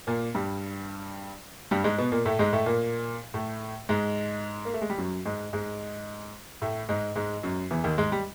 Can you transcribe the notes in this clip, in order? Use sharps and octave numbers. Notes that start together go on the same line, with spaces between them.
A#2 A#3
G2 G3
G2 G3
G#2 G#3
B2 B3
A#2 A#3
A2 A3
G#2 G#3
A2 A3
A#2 A#3
A2 A3
G#2 G#3
A#3
A3
G#3
G3
F#2 F#3
G#2 G#3
G#2 G#3
A2 A3
G#2 G#3
G#2 G#3
F#2 F#3
E2 E3
D#2 D#3
G#2 G#3
G3